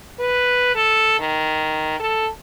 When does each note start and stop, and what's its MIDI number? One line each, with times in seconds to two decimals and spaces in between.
0.20 0.72 71
0.75 1.19 69
1.19 1.97 51
1.99 2.27 69